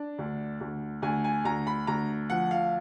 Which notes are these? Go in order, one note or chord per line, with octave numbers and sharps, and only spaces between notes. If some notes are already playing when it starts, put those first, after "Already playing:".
Already playing: D4
D2
D2
D2 G#5
G#5
D2 A#5
B5
D2 A#5
F3 F#5
F5